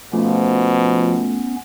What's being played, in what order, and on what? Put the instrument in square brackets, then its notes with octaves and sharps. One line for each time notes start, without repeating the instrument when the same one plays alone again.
[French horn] B2 [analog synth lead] F3 [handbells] A3 F4 [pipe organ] B3 C#4